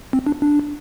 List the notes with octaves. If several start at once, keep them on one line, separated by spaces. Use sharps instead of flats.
C4
D4
D4